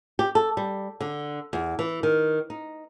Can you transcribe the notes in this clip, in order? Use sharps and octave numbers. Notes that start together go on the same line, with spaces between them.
G4
A4
G3
D3
E2
E3
D#3
D#4